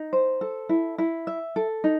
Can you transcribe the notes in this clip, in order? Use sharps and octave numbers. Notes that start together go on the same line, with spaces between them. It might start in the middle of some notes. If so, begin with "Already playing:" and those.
Already playing: D#4
C5
A4
E4
E4
E5
A4
D#4